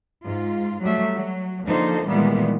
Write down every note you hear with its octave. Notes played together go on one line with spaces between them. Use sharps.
G#2 F4
F#3 G3 A3 E5
F#3
D3 F3 A#3 D#4 A4 C5
A#2 D#3 E3 G3 G#3 B3